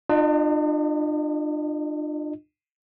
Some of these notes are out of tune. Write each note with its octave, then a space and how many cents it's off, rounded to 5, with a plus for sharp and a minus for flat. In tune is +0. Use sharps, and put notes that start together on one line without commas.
D4 +40 F4 +0 D#5 -10